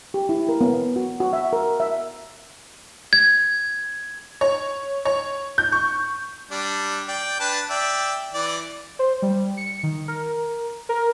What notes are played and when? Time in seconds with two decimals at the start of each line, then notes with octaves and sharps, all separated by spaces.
0.14 G4
0.29 E4
0.49 A#4
0.61 B3
0.96 F#4
1.20 F#4
1.33 E5
1.53 A#4
1.80 E5
3.13 G#6
4.41 C#5
5.05 C#5
5.58 G6
5.72 C#6
6.51 G3 D4
7.08 D5 G5
7.40 D4 B4 A5
7.70 D5 E5 G5
8.34 E3 D5
8.99 C5
9.22 G3
9.57 C#7
9.83 D#3
10.08 A#4
10.89 A#4